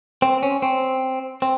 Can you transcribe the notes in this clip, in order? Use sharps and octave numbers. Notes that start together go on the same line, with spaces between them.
C4
C#4
C4
C4